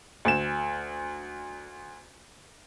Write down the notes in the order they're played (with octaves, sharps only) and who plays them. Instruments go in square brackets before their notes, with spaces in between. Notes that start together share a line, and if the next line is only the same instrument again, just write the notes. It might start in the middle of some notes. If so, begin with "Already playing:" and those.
[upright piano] D2 E7